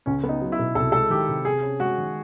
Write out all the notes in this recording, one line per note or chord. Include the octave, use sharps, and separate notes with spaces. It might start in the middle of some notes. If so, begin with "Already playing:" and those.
C#2 C#4
B3
D#4
F#3
E4
B2
C2 A4
G#3 A4
D#3 G4
C3
C3 G#4
C#4
G#3 F#4
D#3